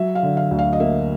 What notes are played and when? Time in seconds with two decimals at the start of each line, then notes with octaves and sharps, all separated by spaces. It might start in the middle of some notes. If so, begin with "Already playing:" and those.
Already playing: F#3 E5
0.15 F5
0.23 D3
0.37 F5
0.51 D2
0.59 F5
0.73 D#5
0.80 A#3 E5